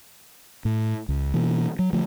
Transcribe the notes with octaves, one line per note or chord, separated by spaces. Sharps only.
A2
C#2
B2 E3 A#3
F#3
D3 F3 A3